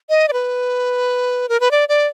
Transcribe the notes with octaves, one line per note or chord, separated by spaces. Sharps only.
D#5
D5
B4
A#4
B4
D5
D5